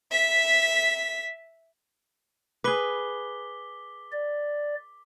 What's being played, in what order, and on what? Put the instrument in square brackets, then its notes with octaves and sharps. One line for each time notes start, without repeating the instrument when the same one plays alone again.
[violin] E5 B6
[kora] G#4 B4 [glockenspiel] D6 B6 G7
[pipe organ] D5